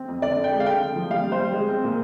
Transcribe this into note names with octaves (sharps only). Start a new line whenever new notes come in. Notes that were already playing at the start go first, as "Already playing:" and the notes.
Already playing: C4
F2
D3 D5
D3
G5
G#3
F5
D3 G5
D3
F3
G3 F5
G3
C5
G3
G#3
C4
A#2